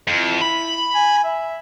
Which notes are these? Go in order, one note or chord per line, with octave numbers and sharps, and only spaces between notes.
F2 E4
B5
G#5
E5